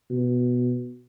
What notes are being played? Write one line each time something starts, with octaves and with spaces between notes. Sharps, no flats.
B2